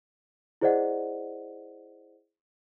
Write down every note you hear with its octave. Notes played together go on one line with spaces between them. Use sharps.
E4 G#4 C5 D5 D#5 F#5